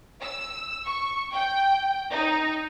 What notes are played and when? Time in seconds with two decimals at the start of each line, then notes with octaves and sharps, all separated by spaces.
0.23 E6
0.87 C#6
1.33 G5
2.12 D#4